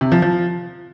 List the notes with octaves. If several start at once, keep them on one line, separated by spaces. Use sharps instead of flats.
C3
F3
F3